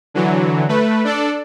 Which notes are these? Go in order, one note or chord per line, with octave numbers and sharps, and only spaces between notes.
D3 E3 F#3
A3 B4
D4 A4 D5